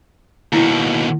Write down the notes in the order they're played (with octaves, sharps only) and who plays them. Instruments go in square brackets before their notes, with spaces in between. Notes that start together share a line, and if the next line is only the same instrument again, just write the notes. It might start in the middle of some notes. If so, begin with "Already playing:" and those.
[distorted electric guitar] D#2 B2 [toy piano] E4 G5